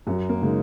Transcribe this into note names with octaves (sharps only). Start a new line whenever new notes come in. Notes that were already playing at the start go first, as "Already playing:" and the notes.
F#2 F#3
A#3
C#3 G#3 D#4